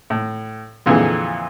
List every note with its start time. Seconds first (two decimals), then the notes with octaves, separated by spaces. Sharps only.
0.10 A2
0.86 F2 A#2 D3 E3 G#4